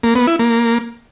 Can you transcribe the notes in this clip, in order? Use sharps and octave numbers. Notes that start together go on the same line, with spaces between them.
A#3
B3
E4
A#3